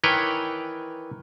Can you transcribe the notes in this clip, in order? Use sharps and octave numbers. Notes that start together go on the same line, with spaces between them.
D#3 E3 B4 C#5 G5